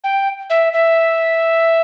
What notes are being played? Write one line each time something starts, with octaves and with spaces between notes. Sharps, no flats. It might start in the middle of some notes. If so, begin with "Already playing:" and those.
G5
E5
E5